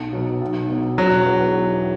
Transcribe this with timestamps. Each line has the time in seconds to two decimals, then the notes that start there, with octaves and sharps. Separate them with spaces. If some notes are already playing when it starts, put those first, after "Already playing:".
Already playing: B1
0.13 B2 F#3
0.41 B1
0.69 B2 F#3
0.97 E1 F#3
1.26 E2 E3 B3